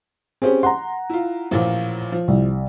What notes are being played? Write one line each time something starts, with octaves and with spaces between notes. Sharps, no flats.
C4 C#4 G4 G#4 C5
F#5 A#5 C6
E4 F4
A1 A#2 F3
F3
C2